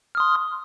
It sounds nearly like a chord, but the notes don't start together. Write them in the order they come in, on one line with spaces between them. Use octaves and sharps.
F6 D#6 C6